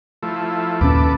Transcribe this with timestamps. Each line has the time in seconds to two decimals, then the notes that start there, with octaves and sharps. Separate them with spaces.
0.23 F3 A3 E4
0.81 D#2 A#2 C#4 A4 B4 D6